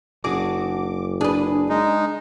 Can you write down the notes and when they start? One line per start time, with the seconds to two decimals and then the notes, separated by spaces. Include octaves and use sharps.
0.24 F#1 D4 F#4 G#4 D6
1.21 D4 G#4 B4
1.69 G#3 D#4